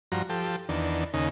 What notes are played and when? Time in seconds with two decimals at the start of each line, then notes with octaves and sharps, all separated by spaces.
0.12 G2 F3 F#4 A#5
0.29 F3 G4 A4
0.69 E2 D#3 D4
1.14 D#2 C#3 D#4